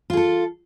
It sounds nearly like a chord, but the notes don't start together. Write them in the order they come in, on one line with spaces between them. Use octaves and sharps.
F4 G#4 A4